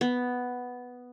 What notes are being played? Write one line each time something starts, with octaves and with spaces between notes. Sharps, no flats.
B3